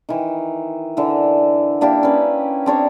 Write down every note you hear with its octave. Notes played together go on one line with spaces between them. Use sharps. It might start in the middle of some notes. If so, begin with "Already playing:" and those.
D#3 E3
D3 E3
A#3 D4 E4 G4
C#4 B4
C4 D4 C#5 A#5